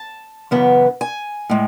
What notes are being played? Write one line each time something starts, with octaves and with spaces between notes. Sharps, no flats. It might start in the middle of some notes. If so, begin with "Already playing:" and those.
Already playing: A5
F#2 C#3 E3 B3
G#5
A2 G#3